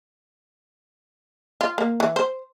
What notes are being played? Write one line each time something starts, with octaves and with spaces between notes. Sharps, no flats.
F4
A#3
E3
C5